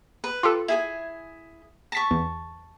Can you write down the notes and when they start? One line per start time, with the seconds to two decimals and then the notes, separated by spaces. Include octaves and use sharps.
0.24 B4
0.43 F4 G4 A4
0.68 E4 G#4 G#5
1.92 A5 C#6 A#6 B6
2.11 E2